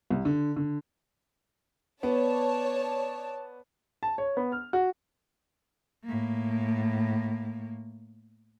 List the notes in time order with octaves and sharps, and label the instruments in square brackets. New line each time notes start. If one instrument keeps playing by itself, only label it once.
[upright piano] C2
D3
D3
[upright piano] B3 [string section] C#5 D5 A5
[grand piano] A5
C#5
B3
F6
F#4
[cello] A2 A#3